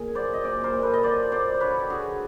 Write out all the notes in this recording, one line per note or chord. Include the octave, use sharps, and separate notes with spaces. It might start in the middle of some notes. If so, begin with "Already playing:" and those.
Already playing: A#2 G#4
F#3 C5 D5
D#5
A#2 C5 D5
A#4 C5
A#2
A4 B4
D#5
F#3 C5 D5
F#3 C5 D5
C5
D3 B4 C#5
G4
D3 F#4 G#4